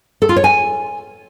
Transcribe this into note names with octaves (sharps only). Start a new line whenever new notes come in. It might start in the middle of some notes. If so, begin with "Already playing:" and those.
A4
F4
C#5
G#5